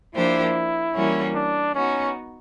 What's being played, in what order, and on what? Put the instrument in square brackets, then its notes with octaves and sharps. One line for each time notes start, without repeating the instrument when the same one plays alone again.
[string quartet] F3 A#3 D4 G4 C5 [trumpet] E4
[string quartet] E3 G3 A#3 C#4 F#4
[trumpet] D4
[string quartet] B3 D#4 F#4 [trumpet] C#4